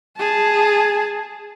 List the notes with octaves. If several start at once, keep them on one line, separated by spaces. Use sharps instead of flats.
G#4 A5